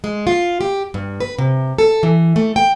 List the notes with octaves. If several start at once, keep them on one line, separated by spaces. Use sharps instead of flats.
G#3
F4
G4
G2
B4
C3
A4
E3
A3
G5